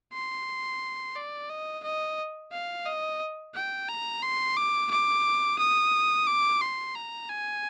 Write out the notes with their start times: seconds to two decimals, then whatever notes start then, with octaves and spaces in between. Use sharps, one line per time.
0.13 C6
1.16 D5
1.50 D#5
1.84 D#5
2.52 F5
2.86 D#5
3.55 G5
3.88 A#5
4.22 C6
4.57 D6
4.91 D6
5.59 D#6
6.27 D6
6.61 C6
6.95 A#5
7.29 G#5